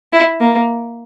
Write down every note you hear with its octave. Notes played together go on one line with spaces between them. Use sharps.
E4
A#3